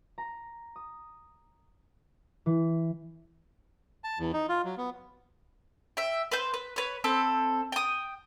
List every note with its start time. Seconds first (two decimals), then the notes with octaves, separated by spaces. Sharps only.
0.18 A#5
0.76 D#6
2.46 E3
4.04 A5
4.19 E2
4.33 D#4
4.49 F4
4.65 F#3
4.78 B3
5.97 E5 G5
6.32 B4 C5 G6
6.54 B4
6.76 B4 C#5
7.04 C4 A4 B5
7.72 G5 D#6